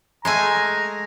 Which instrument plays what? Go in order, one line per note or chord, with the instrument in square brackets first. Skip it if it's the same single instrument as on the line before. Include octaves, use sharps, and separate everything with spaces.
[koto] G#3 A3 G#5 [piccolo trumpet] A#5